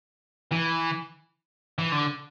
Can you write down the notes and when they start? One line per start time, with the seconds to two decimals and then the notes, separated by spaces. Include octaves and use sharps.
0.52 E3
1.79 E3
1.92 D3